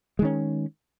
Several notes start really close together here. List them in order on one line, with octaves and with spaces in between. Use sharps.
G#3 D#3 C#4